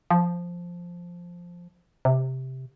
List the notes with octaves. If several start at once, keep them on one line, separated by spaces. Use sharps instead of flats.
F3
C3